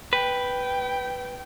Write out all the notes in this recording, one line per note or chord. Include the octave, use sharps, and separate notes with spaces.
B4 G5